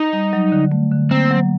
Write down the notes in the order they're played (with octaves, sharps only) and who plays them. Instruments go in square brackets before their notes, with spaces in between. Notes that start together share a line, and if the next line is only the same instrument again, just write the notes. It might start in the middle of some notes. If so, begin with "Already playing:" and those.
Already playing: [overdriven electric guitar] D#4
[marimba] G3
F#3
D3
A3
D3
[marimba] A#3 [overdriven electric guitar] C4
[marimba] F#3